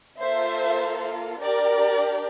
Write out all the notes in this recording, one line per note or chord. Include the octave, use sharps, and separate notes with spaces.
A#3 F4 A4 C5 E5
D4 G4 A#4 D5